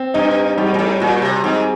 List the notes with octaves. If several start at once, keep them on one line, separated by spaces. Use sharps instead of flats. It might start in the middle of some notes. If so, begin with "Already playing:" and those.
Already playing: C4
G2 D#4
G#2 G3
A#2
A2
A#2 F#4
C3
G#2 C4